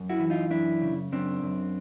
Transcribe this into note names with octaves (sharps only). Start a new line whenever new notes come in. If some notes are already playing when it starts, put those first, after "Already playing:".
Already playing: F#2
E4 F#4
E3
D#4 F4
F#2 D4 E4
C#3
F#2 C4 D4
F#2